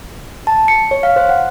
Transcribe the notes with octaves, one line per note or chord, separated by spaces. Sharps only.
A5
C#7
C#5
F5
C5
F#5